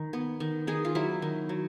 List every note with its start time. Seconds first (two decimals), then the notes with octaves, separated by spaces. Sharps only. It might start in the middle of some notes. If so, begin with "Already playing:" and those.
Already playing: D#3
0.13 B3
0.40 D#3
0.67 D#3 G#4
0.85 F4
0.95 F#3 E4
1.22 D#3
1.49 F#3